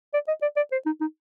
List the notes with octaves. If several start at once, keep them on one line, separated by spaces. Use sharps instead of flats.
D5
D#5
D5
D5
C5
D#4
D#4